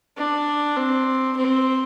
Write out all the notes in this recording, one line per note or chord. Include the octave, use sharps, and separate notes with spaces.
D4
C4
C4